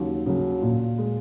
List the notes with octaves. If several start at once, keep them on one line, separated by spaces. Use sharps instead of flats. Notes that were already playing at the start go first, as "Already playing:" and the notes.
Already playing: D#2 C#3 F#3
C#3 F#3
A#2
G#3